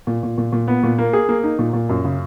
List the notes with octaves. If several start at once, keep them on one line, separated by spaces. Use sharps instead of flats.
A#2
A#2
A#2
A#2
B3
A#2
A#3
G#4
A#3
D#4
A#2
A#2
F#2
C#3